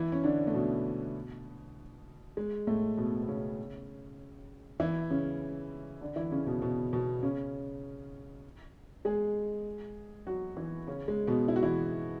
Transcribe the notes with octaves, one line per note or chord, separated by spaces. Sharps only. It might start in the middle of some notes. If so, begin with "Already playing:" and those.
Already playing: E3 E4
C#4
D3 D4
A3
B2 B3
G#3
A2 A3
B2 B3
B3
C#3 C#4
E3 E4
C#3 C#4
D3 D4
E3 E4
C#3 C#4
B2 B3
B2 B3
B2 B3
C#3 C#4
G#3 G#4
F#3 F#4
E3 E4
C#3 C#4
G#3
B2 B3
E4
F#4
E3 E4